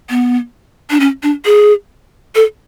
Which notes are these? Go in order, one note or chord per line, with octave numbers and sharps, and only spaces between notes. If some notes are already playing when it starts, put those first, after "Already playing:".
B3
D4
C#4
D4
G#4
A4